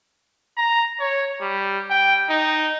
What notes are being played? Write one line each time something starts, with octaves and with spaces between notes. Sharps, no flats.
A#5
C#5
G3
G5
D#4